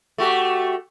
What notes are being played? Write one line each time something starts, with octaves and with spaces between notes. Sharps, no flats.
A3 F#4 G4